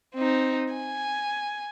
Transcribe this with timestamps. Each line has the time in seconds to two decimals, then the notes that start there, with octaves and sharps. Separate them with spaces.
0.15 C4 D#4
0.74 G#5